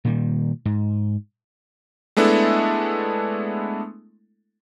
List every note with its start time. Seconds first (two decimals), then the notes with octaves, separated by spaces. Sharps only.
0.05 A#2 D#3 G3
0.65 G#2
2.17 G#3 A3 B3 D4 E4 A4